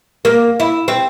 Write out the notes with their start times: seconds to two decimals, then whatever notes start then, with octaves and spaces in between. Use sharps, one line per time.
0.25 A#3
0.60 E4
0.88 C4